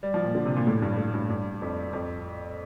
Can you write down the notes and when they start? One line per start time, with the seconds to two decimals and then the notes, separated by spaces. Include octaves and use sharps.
0.03 G3
0.14 F3
0.24 A#2
0.35 D3
0.45 C3
0.56 A#2
0.67 A2
0.82 G2
0.98 A2
1.14 G2
1.29 G2
1.62 F2
1.93 F2